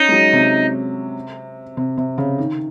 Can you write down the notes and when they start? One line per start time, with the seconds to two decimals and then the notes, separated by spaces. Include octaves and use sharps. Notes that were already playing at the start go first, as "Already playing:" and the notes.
Already playing: C#4 D#4
0.09 G#3
0.12 F#3
0.33 C3
1.77 C3
1.98 C3
2.18 C#3
2.38 D#3